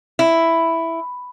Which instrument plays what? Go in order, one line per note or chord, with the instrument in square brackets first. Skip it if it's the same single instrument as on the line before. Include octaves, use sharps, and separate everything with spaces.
[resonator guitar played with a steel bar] E4